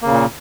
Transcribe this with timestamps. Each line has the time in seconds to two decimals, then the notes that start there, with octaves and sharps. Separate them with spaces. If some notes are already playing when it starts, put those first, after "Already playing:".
0.01 A#3
0.06 C#3
0.11 A#2